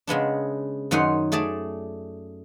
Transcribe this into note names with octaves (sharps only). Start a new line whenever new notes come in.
C#3 G#3 B3 D4
F#2 D#3 C#4 D#4 F#5 C6
A3 G#4 D5 A5